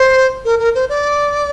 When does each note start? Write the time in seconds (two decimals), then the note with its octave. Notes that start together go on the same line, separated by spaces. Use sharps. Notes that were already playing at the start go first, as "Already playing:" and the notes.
Already playing: C5
0.45 A#4
0.59 A#4
0.75 C5
0.89 D5